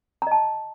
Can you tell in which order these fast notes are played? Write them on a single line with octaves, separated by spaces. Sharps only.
A#5 D#5 A5